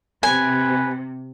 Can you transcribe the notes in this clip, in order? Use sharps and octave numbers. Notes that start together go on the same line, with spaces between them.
C3 B4 G#5